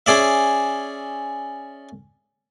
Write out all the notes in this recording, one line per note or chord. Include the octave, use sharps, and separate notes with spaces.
C#4 G#4 D5 E5